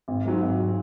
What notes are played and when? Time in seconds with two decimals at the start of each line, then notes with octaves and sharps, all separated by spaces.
0.08 G#1
0.25 G#2 F#3
0.42 G#1
0.59 F#3